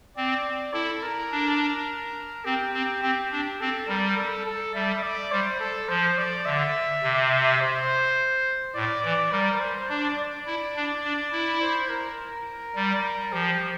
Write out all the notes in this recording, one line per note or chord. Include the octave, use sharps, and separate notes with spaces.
C4 D5
E4 A4
A#4
D4
C4 G4
C4
C4 G4
D4
C4 A4
G3 A#4
A4
A4
G3 E5
D5
G3 C5
A4
F3 C5
D5
D3 E5
C3
C5
A2 D5
E3 D5
G3 A#4
C5
D4 D5
D5
E4
D4
D4
E4
C5
A#4
G3
F3 G4